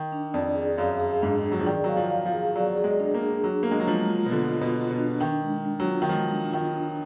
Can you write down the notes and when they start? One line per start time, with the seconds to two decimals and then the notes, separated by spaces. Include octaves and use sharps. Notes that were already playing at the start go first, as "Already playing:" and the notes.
Already playing: D#3
0.12 D4
0.34 F2 D5
0.55 G#4
0.77 F#2 F5
1.00 G#4
1.22 G#2 D4
1.44 G#4
1.52 F#3
1.59 F3
1.66 D#3 D5
1.84 F#3 F5
1.96 F3
2.10 F5
2.25 F3
2.33 G#4
2.56 F#3 D5
2.77 G#4
2.84 G#3
3.00 D4
3.14 A#3
3.22 G#4
3.44 F#3 D4
3.63 A#3 D4
3.71 G#3
3.80 F#3
3.87 F3 G#3
4.10 F4
4.26 B2
4.32 D3 F4
4.54 F4
4.61 B2
4.76 F4
4.91 B2
4.98 D4
5.20 D#3 D4
5.43 G#3
5.65 D4
5.80 F#3
5.87 F4
6.02 D#3
6.09 F3 G#3
6.32 D4
6.53 D#3 F4
6.75 D4